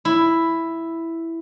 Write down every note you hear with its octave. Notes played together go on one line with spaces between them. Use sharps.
E4